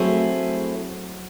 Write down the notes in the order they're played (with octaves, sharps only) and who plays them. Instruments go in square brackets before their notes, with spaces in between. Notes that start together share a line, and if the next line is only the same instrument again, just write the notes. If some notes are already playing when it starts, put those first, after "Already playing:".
Already playing: [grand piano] F#3 [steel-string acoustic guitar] A3 C4 E4 G#4